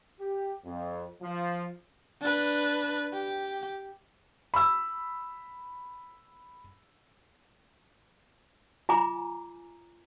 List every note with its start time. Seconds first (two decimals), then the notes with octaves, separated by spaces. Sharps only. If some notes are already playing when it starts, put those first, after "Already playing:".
0.20 G4
0.65 F2
1.22 F3
2.21 D4 B4
3.13 G4
4.54 B5 E6
8.89 F4 G#5 A#5 D6